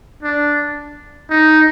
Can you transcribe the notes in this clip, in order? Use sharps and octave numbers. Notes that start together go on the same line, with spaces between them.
D4
D#4